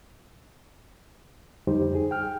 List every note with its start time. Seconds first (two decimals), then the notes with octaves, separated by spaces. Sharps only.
1.67 F2 D3 G3 D#4 G4 C5
1.95 G#4
2.11 G5 F6